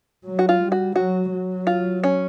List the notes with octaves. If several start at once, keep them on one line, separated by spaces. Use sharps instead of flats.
F#3
F#4
F4
G3
F#4
F#3 F#4
F#3
F4
C#4